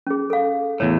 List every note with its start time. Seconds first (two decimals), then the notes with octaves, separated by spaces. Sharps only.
0.07 C#4 G#4
0.30 A4 F5
0.80 E2 A2 C#5